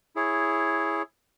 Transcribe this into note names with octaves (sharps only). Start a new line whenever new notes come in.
E4 G#4 C#5